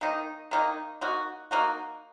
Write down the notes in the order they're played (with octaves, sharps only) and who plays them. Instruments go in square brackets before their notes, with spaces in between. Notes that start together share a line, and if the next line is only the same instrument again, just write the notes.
[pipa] D#3 A#3 D#4
D#3 A#3 D#4
A#3 D#4 F#4
A#3 D#4 F#4